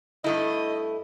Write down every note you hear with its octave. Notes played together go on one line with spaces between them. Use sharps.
G2 A3 E4 D#5